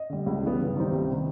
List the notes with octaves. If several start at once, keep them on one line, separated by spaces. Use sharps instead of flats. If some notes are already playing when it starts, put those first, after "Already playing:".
Already playing: D#5
D3 G3
C#2
C#3 E3 G3 B3
G2
D#3 G3 C4 D#4
C2
C3 D#3